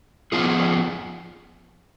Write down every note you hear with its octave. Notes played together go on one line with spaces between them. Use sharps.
F2 F3 B3 F4 G#4